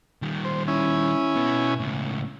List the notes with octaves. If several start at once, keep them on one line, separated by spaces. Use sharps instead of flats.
D#3 G3
C5
C#4 E4 G#5
B2 B3
C#2 A2